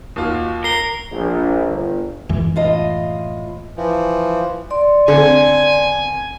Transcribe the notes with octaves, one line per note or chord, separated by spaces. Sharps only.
D#2 F4 F#4
A#4 C7 G7
A#1
G1
F#2 E3 G#3
A2 F4 D#5
E3 F3
D5 C6
D3 C4 G#5